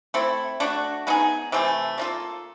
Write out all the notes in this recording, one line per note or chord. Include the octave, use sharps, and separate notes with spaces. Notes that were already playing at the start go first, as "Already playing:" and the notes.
A3 C4 E4
A3 D4 F#4
G#3 B3 D#4 G#4
C3 E3 A3
A#3 D4 F4 A4